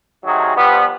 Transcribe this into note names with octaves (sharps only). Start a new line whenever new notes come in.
C3 D#3 F#3 A3 F#4 G#4
F3 G3 B3